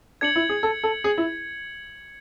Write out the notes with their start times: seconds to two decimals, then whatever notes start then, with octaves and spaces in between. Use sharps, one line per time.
0.21 D4 G#6 C#7 F#7
0.36 E4
0.49 G#4
0.63 A4
0.84 A4
1.04 G#4
1.18 E4